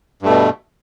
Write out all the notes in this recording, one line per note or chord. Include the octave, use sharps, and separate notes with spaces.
G2 B2 A3